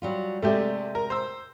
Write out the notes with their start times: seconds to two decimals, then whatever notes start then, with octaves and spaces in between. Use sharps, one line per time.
0.02 F#3 G3 F4
0.42 C3 G#3 A3 G4 D5 E5
0.95 A#4
1.10 C5 E6